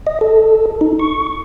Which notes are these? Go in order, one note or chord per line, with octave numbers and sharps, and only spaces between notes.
D#5
A4
D#4
C#6